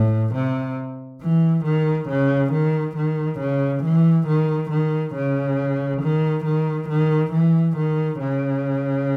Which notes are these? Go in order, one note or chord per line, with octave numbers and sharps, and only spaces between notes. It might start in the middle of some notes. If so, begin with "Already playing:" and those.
Already playing: A2
C3
E3
D#3
C#3
D#3
D#3
C#3
E3
D#3
D#3
C#3
D#3
D#3
D#3
E3
D#3
C#3